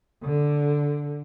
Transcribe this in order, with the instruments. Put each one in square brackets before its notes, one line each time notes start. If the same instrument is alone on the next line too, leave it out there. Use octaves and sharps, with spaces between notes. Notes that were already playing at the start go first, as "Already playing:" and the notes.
[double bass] D3